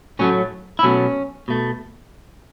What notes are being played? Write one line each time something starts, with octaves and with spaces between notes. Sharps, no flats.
A2 F#3 A3 C#4
E4
B2 F#3 A3 C#4
B2 A3